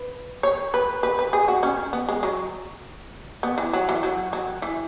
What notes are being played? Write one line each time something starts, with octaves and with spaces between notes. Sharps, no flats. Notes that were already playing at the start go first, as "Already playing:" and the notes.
Already playing: B4
C#5
B4
B4
B4
G#4
F#4
C#4
B3
G#3
F#3
B3
E3
F#3
E3
F#3
F#3
E3